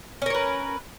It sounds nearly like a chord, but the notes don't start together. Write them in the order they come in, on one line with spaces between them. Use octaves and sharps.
C#4 A#4 C#5 B4